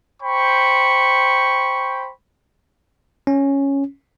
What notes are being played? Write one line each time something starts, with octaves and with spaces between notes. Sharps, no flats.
C5 G5 B5 C#6
C#4